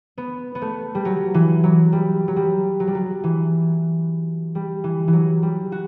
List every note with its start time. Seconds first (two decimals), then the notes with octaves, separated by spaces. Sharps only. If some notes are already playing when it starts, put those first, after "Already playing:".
0.18 B3
0.55 B3
0.62 A3
0.95 G3
1.05 F#3
1.34 E3
1.64 F#3
1.92 G3
2.28 F#3
2.36 G3
2.80 F#3
2.87 G3
2.95 F#3
3.24 E3
4.55 G3
4.84 E3
5.08 E3
5.13 F#3
5.43 G3
5.72 F#4